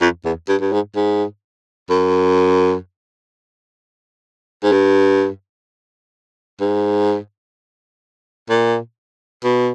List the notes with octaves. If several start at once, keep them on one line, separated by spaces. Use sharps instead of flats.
F2
E2
G2
G2
G#2
G#2
F#2
G#2
G2
G#2
A#2
B2